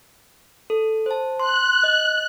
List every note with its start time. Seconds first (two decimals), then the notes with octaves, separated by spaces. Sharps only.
0.70 A4
1.06 C5 A5
1.40 C6 F#6
1.83 D#5